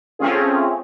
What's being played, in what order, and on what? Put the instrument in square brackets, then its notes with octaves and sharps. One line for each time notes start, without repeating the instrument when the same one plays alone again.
[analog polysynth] A3 C4 C#4 F4 G#4